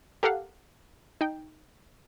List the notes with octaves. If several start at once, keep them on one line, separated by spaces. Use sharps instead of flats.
G4 A4 A#4 F5 F#5
D#4 G5